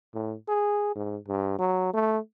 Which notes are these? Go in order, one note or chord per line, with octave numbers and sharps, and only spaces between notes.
A2
G#4
G#2
G2
F#3
A3